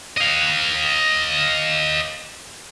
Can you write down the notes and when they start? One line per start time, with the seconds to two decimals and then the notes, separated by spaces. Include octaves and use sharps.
0.17 D#5 F5